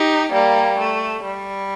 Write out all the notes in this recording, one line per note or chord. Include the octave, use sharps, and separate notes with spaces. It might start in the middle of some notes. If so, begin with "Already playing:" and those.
Already playing: D#4 G4
G3 A#3
A3
G3